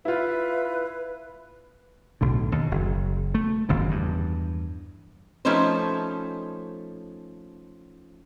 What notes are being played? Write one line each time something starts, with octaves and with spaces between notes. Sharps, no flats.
E4 F4 B4
B1 A2 D3
D#2
F#1
A3
F#1 D#2 G#2 C#3
E2 G2
F3 A3 C#4 D#4 B4 C5